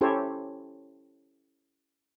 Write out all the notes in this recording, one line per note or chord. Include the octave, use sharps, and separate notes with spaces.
C#4 E4 G4 A4 C5 C#5